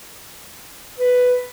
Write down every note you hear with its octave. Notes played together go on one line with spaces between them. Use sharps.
B4